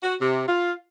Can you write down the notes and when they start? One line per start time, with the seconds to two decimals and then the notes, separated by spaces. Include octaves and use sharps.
0.02 F#4
0.21 C3
0.47 F4